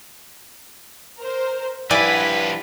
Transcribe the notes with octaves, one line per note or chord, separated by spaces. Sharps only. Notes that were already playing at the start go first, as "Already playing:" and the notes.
A#4 C5
G2 F3 E4 B4 D5 F#5 G#5 B6